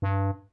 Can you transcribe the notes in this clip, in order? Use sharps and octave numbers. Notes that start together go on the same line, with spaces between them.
G2